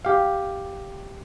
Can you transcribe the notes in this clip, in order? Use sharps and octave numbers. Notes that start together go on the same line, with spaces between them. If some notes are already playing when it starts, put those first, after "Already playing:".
G4 F5